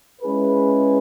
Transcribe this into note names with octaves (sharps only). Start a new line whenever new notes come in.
G#3 C#4 E4 G#4 B4